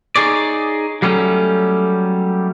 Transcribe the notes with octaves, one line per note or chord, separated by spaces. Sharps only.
D#4 G#4 C#5 D5
F#3 G3 A3 C#4